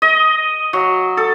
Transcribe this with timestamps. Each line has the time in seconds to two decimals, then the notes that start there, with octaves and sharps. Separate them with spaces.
0.02 D#5
0.73 F#3
1.17 A4